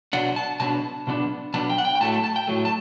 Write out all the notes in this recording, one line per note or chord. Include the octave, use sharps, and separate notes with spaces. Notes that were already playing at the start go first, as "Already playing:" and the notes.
B2 F#3 B3 D4 F#5
A5
B2 F#3 B3 D4 A5
B2 F#3 B3 D4
B2 F#3 B3 D4 A5
G5
F#5
G5
G5
A2 F#3 A3 A5
A5
A5
G5
A2 F#3 A3
A5